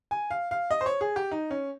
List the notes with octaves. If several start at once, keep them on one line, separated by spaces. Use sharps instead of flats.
G#5
F5
F5
D#5
C5
C#5
G#4
G4
D#4
C#4